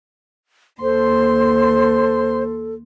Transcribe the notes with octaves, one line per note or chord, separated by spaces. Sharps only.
D#2 A4 C5 C6